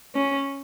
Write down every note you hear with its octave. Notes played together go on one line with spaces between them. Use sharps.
C#4